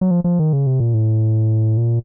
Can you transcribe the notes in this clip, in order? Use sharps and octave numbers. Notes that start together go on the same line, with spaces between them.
F#3
F3
F3
D#3
C#3
C3
A#2
A2
A#2